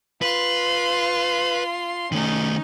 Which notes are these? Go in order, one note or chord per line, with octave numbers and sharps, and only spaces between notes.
F4 B4 C6
D#3 A3 C#4 D#4